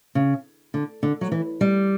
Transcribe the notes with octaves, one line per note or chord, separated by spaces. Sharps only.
C#3
D3
D3
F#3
E3
G3